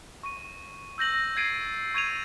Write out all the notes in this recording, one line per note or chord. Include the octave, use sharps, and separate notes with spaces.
C#6 D#7
E6 G6 A#6 F#7
G#6 A6 C7 D7 D#7
C#6 G#6 D#7 F7